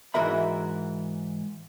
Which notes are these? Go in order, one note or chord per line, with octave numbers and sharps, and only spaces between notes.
G#2 E3 F#4 A#4 E5 B5